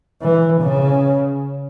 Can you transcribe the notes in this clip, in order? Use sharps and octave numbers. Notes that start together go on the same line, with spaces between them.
E3
C#3